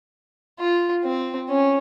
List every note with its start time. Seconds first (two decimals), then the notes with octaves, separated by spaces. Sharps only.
0.60 F4
1.04 C4
1.50 C#4